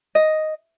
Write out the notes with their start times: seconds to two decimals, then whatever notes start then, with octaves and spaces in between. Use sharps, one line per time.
0.15 D#5